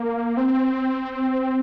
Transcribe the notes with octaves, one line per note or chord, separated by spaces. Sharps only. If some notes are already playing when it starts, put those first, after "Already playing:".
Already playing: A#3
C4